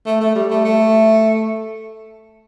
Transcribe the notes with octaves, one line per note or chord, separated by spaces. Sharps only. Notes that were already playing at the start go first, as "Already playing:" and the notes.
A3
A3
G3
A3
A3